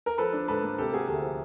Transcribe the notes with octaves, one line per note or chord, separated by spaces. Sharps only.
A#4
F3 A4 B4
D4
G#2 A4 B4
A#3
C3 G4 A4
A#3 F#4 G#4
D2 G4 A4
F3